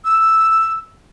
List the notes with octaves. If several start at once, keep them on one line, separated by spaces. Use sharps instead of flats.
E6